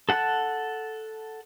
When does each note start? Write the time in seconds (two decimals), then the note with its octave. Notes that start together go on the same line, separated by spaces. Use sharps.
0.09 A4 F#5 A5 F#6